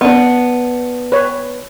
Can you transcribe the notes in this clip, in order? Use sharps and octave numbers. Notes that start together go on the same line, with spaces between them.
B3 D4
B4 C#5